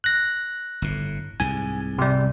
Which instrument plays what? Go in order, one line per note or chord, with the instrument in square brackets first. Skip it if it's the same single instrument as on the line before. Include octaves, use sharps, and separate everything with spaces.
[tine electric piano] F#6 A#6
[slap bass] G1 A2
[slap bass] C2 G#2 [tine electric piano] G#5
[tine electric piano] C3 G3